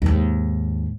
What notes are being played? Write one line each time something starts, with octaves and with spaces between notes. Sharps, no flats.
D#2 G#2